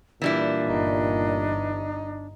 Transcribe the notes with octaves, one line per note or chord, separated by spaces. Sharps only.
A#2 E3 G3 D4 E4
G1 D#4